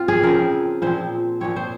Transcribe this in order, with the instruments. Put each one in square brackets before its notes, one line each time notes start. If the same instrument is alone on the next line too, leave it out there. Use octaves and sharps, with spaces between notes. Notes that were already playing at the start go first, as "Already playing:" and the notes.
Already playing: [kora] C4 F4
G#4
C#3 F3 C4 A#4
A#2 F3 C4 C5
A#2 F3 C4 C#5
C5